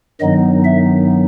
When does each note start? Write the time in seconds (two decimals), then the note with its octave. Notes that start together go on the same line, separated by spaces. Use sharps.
0.20 G2 D#3 F#3 B3 D#4 D#5
0.64 E5